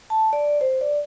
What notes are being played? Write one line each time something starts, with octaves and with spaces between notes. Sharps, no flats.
A5
D5
C5
D5